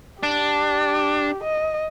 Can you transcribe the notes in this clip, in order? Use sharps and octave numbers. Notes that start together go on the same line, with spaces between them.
D4 G4
D#5